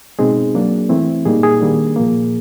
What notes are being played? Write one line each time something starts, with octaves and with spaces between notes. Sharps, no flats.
B2 G#3 C4 D#4 G#4
F#3 A#3 D4
E3 A3 C4 E4
A#2 G3 A#3 D#4 G#4
G#4
D#3 G3 A#3 D4
A#2 F3 A#3